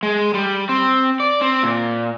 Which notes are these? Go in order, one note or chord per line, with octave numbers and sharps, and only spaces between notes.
G#3
G3
C4
D5
C4
A#2